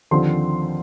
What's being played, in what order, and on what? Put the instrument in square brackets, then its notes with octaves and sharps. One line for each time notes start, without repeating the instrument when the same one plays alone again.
[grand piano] D#2 D3 F3 C4 C6